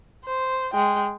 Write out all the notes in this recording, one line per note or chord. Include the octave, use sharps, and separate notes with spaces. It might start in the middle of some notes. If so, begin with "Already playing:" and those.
C5
G#3 G5